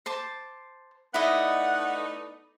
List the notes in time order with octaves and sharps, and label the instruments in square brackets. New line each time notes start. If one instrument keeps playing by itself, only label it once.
[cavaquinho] C5 A5 D6
[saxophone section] A3 B3 D#4 [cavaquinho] E4 D5 D#5 [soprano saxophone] F#5